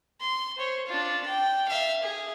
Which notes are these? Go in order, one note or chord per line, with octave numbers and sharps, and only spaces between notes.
C6
C5 C#5
D4 F4
G5
E5 F5
G#4